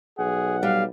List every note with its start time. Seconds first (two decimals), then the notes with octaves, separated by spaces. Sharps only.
0.18 B1 G#4 F#5
0.63 G3 F5